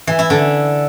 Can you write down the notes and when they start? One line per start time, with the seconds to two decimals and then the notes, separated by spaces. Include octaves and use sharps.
0.07 E3
0.19 E4
0.30 D3